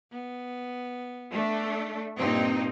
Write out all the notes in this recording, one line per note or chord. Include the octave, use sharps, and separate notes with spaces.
B3
A3 D4
G2 A#2 A#3 C4 D#4